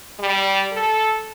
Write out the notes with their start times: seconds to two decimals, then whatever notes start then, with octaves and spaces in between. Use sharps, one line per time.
0.19 G3
0.72 A4